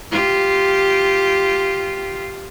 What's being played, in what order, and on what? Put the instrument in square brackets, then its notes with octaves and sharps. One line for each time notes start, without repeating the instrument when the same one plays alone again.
[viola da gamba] F4 G4